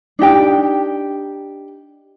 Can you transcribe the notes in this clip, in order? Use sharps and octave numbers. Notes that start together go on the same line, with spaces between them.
D4 D#4 G4 G5